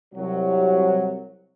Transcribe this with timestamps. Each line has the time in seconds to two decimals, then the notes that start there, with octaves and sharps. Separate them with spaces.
0.14 C2 F#3